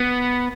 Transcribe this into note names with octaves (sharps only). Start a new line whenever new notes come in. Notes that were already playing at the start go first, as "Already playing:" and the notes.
Already playing: B3